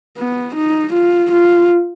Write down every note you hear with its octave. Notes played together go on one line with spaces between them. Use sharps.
B3
D#4
F4
F4